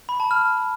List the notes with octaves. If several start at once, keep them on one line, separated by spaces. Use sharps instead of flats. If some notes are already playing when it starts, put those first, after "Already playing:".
B5
A5
F6